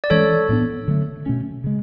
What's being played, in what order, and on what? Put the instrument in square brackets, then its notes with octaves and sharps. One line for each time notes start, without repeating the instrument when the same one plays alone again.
[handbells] D5
[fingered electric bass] E3 G#3 C#4 [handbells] A4 C#5
[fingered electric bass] A2 G#3 B3 D4
D3 F#3 A3
B2 A3 C#4
C#3 G#3